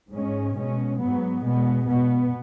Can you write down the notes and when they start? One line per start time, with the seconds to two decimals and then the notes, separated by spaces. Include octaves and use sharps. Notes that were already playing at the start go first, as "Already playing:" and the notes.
0.11 G#2 G#3 C#4
0.55 B2 G#3 C#4
0.99 G#2 F#3 B3
1.43 B2 G#3 B3
1.87 B2 B3